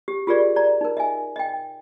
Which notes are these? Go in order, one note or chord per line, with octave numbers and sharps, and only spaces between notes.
G4
F4 G4 G#4 A#4 D5
D5 A#5
D#4 A#4
D#5 E5 G#5
D#5 G5